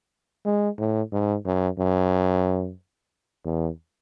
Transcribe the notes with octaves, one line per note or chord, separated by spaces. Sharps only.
G#3
A2
G#2
F#2
F#2
E2